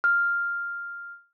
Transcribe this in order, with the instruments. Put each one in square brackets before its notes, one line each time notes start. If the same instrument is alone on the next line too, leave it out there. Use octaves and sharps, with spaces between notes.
[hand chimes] F6